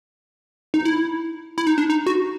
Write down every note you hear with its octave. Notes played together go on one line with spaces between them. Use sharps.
D#4
E4
E4
D#4
D4
D#4
F#4